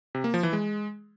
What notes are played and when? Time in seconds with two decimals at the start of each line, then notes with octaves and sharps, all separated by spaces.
0.15 C3
0.24 A#3
0.34 F3
0.43 E3
0.53 G#3